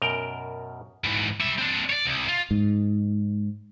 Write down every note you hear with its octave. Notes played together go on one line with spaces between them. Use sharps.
F#2 B2 A#4 G5
G#2 E3
G3 E5
C4 D4
C#5 D5
C2
F4
G#2